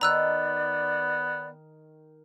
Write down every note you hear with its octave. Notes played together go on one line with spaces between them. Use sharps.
D#3 B3 D5 A#5 E6 F#6